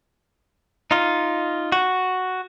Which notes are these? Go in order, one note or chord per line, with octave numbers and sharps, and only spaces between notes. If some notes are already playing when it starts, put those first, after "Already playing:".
D#4 F4
F#4